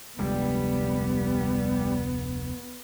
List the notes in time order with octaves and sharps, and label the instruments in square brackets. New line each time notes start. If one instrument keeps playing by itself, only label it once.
[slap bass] F1 D2 G#3 [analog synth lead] G3 [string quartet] B3